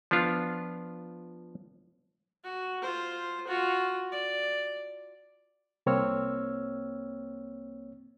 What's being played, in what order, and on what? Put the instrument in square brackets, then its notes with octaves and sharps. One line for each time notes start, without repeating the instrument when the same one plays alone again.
[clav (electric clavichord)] F3 B3 D4 F4
[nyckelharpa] F#4
F4 C5
F4 F#4
D5
[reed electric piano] C2 A#3 C4 C#5 E6 F6